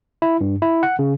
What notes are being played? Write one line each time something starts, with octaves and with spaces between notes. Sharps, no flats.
E4
G2
E4
F#5
C#3